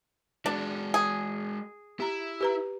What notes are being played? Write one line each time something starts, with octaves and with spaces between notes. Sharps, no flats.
G#3 D4 F#4
G#4
E4 G4 A#5
G4 B4 A#5